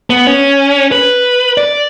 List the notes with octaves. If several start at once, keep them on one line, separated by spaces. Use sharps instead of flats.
B3
C#4
B4
D5